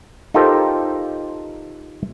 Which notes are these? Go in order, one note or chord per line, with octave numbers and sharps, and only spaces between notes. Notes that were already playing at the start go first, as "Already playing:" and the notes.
D#4 F4 G4 A4 A#4 C5